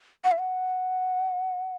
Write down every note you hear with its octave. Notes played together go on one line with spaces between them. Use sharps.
F#5
E5
F#5